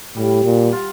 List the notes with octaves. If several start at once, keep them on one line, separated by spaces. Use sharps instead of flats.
A2 G3
A#2
F4